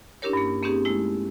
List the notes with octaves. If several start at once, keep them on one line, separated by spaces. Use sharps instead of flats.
C#4 D4 E4 G4 A#4 C#5
G2 A#3
A#3 C4 C#4 D#4 G4 G#4
G#3 A3 E4